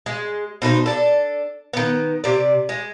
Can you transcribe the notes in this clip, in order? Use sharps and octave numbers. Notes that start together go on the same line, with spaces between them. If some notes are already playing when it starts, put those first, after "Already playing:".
G#3
B2 D#4 G#4 C5
D4 A4
D#3 B3
C3 D5
G#3